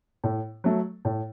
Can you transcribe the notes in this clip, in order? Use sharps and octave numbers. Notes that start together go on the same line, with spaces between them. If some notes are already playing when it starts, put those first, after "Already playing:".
A2
F#3 A3
A2